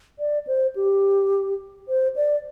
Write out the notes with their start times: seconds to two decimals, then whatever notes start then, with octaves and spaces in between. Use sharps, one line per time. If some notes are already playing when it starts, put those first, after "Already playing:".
0.19 D5
0.47 C5
0.76 G4
1.88 C5
2.16 D5